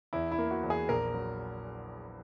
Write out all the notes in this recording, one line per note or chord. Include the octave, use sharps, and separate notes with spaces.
E2 E4
E4
A#3
F#4
E2
G#4
A#1 A#4
F#3